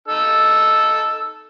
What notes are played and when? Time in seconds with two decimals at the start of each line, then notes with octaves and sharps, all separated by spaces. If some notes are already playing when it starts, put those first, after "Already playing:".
0.08 D#4 A4 E6